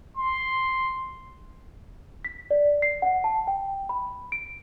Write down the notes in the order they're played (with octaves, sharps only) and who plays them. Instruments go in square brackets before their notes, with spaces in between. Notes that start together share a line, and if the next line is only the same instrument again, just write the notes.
[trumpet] C6
[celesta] B6
D5
C7
F#5
A5
G5
B5
D7